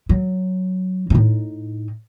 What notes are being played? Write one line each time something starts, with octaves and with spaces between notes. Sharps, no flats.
F#3
A2 D#4